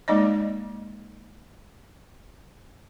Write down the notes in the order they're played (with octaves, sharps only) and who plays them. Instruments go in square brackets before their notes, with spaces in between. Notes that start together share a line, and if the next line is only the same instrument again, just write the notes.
[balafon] G#3 A#3 D#4 D5 D#5